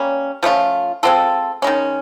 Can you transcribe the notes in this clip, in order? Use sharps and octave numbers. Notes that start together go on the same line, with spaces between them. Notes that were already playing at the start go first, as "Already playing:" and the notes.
Already playing: G3 A#3 C#4
F3 A3 C#4 F4
G#3 C4 F4 A4
D#3 G#3 C#4